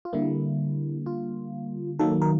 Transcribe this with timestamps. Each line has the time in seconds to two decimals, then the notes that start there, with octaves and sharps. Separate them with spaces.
0.05 F4
0.13 D3 G3 A#3 E4
1.06 F4
1.99 D#3 F#3 A#3 A4
2.22 A#4